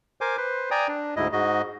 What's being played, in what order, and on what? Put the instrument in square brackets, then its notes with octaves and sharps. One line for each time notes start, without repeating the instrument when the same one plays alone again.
[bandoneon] A#4 C5 G#5 D6
B4 C5
D5 G5 G#5 A#5 D#6
D4
D2 G#2 E4 D#5
G#2 F#4 D#5